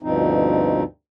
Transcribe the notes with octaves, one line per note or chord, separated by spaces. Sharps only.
D2 G2 B2 F3 C4 D#4